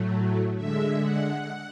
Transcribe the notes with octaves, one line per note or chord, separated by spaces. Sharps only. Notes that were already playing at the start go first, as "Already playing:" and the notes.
Already playing: A2 F#3 A3
D3 G#3 E5
F#5